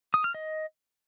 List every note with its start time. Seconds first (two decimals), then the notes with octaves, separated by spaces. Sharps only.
0.14 D#6
0.24 F6
0.34 D#5